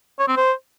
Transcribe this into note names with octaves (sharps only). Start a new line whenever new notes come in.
C#5
C4
C5